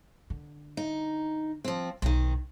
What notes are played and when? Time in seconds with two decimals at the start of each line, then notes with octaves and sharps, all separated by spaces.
0.30 D3
0.77 D#4
1.64 F3 C4
2.02 B1 D#3 C4